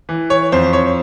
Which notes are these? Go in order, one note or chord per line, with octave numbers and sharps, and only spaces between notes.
E3
C#5
F2 C5
C#5